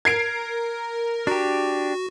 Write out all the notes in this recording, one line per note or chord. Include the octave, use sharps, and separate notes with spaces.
A#4 G#6 C7 D7
D4 F#4 G4